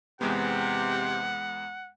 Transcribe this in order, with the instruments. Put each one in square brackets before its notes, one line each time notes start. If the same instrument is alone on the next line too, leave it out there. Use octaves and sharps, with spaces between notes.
[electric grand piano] E2 G#3 B3 [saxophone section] C3 [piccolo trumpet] F#5